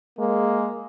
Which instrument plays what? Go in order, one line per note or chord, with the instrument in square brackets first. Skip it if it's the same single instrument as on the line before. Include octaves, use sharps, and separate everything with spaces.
[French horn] G#3 [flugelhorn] A#3